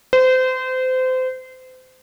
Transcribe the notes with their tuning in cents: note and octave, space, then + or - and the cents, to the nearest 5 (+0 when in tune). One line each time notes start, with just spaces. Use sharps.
C5 -30